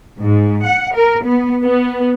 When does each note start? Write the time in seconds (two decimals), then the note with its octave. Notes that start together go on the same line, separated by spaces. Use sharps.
0.20 G#2
0.65 F#5
0.95 A#4
1.25 B3
1.64 B3